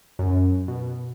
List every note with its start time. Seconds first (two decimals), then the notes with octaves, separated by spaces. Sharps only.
0.19 F#2
0.68 B2